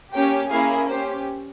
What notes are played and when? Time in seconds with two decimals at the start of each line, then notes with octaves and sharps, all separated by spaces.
0.13 A#3 C#4 G4 G5
0.51 A#3 C#4 E4 G#4 F5
0.88 C#4 G4 C5